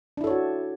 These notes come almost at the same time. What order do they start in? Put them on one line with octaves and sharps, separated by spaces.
D4 E4 A4 C#5 F#4